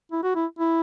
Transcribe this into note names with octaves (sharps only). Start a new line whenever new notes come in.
E4
F#4
E4
E4